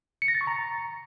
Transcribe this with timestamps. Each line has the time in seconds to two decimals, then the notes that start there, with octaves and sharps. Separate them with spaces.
0.22 C#7
0.28 A#6
0.35 A6
0.41 C#6
0.47 A#5